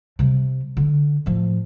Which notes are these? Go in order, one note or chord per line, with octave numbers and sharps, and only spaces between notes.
C3 G3
D3
A2 F3